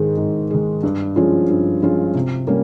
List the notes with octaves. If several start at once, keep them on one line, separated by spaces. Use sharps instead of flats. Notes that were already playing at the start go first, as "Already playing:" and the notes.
Already playing: G#2 D#3 G#3
G#2
D#3 G#3
G2
F3 G#3 C#4 F4
G2
F3 G#3 C#4 F4
C3
G3 A#3 C#4